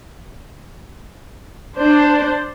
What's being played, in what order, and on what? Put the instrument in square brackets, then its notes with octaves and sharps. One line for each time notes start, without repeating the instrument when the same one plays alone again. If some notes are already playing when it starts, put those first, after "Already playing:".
[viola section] D4 C5